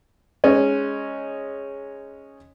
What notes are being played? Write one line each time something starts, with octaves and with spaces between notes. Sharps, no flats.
G#3 C#4 D#4